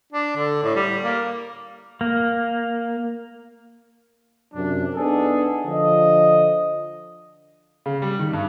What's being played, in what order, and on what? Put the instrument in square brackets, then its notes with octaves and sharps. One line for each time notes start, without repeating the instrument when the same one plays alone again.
[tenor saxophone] D4
D3
A2
G3
A#3
[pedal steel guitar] A#3
[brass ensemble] F#2 C3 F#3 D4
B3 D4 D#4 G#4 A4
D3 F3 D#5
[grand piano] C#3
G3
D#3
G2